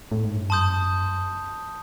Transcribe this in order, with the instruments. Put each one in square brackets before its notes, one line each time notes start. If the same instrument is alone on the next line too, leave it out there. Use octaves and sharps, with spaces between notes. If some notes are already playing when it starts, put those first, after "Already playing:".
[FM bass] A2
G#2
G2
[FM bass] F#2 [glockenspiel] A5 C6 D#6 G6